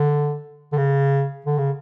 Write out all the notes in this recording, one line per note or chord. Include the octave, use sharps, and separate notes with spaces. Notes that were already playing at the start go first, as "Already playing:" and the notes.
Already playing: D3
D3
C#3
D3
C#3